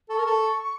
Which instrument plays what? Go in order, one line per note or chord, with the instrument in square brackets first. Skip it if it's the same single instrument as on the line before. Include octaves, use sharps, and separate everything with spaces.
[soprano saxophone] A4 [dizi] C#6
[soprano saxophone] A#4
A4